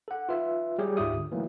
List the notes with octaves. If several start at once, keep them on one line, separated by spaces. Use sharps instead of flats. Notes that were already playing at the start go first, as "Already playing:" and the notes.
A4 F#5
F4 B4 E5
G3 G4 G#4 C#5
D2 G#2 F4 G4 E5 D#6
D3
E3 F#3 A3 A#3